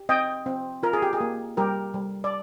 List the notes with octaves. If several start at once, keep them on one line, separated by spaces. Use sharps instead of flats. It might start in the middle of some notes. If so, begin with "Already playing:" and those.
Already playing: G4
C4 D#5 G5
C4
F4 A#4
G#4
G4
G#4
A#3
G3 G4 A#4
G3
D5